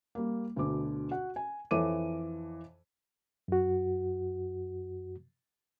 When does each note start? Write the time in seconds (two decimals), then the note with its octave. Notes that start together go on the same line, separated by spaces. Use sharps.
0.15 G3 A#3
0.56 D2 B2 D3 D6
1.11 F#4 F#5
1.36 G#5
1.71 F2 E3 A4 C#5 D6 D#7
3.48 F#2 F#4